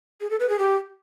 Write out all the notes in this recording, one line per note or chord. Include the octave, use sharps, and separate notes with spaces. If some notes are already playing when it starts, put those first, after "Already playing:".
G#4
A4
B4
G#4
G4